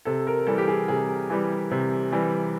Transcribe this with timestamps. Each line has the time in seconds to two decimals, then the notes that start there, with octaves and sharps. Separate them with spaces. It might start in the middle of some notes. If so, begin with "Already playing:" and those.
0.05 C3 A4
0.27 A#4
0.47 E3 G3 A4
0.58 G4
0.68 G#4
0.88 C3 G#4
1.30 E3 G3
1.71 C3
2.12 E3 G3